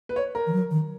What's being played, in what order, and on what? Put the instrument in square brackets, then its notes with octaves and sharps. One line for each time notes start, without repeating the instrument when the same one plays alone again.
[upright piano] B4
C#5
A#4
[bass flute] E3
F#3
D#3